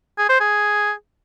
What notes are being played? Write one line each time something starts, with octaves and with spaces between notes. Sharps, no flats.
G#4
C5
G#4